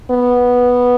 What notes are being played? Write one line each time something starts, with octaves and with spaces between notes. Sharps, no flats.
B3